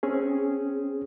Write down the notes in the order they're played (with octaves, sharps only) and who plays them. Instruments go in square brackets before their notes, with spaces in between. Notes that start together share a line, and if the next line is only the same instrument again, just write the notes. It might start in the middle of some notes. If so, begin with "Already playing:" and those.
[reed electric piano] C4 C#4 G#4